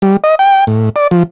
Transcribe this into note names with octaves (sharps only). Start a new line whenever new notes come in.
G3
D#5
G5
A2
D5
F3